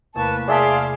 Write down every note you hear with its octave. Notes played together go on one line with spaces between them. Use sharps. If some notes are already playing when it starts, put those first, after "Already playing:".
E2 C3 A3 A#3 B4 A5 C#6
G#4 D5 E5 F5 A5 C6 D6